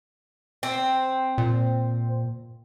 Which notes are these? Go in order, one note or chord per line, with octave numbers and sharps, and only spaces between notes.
C4
A#2